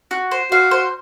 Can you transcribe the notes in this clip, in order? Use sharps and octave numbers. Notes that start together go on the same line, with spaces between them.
F#4
C5
F#4 F5
C5